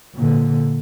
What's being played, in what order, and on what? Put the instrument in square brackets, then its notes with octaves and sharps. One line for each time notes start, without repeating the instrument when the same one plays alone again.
[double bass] A#2 D3